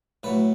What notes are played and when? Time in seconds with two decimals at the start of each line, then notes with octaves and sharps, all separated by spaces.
0.23 A2 F#3 B4